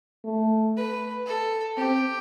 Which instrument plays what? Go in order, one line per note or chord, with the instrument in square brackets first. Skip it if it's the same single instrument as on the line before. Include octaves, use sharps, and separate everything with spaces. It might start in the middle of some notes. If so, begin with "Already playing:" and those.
[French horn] A3
[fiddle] B4
A4
[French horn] C4 [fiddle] G4